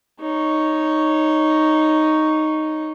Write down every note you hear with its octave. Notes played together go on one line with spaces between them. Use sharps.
D#4 C#5